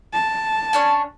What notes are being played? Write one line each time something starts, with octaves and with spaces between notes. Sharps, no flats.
A5
C#4 D4 C#5